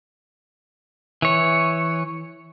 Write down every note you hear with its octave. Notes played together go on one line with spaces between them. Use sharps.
E3 C#5